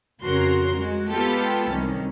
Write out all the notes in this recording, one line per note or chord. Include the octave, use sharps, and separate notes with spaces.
F2 C#3 F#4 A#4 C6
G#3 F#4
G#3 B3 F4 G4 A4
C2 D#3 C#4